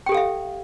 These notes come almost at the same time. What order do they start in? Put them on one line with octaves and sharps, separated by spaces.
G5 G4 A4 F5 E5